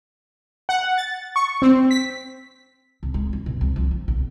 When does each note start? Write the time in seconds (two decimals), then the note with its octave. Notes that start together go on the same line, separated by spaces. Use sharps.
0.69 F#5
0.98 A6
1.36 C#6
1.62 C4
1.91 B6
3.03 C2
3.14 G#3
3.33 F#2
3.46 B2
3.61 C2
3.76 F3
3.91 F2
4.08 B1